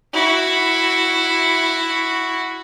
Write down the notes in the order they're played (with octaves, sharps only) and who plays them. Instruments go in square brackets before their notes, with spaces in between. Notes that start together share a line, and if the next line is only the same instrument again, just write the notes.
[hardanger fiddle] E4 F#4